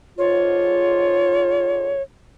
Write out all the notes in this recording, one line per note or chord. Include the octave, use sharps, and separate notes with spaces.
G#2 D3 F4 C#5